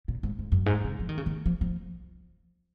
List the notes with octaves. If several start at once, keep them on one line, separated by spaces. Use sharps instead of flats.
A#2
G#2
G#2
F#2
G#2
C#3
F3
D#3
C#3
D#3
F3
F3